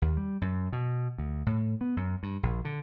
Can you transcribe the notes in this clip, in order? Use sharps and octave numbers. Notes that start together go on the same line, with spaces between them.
D#2
G3
F#2
B2
D2
A2
B3
F#2
G2
A#1
D3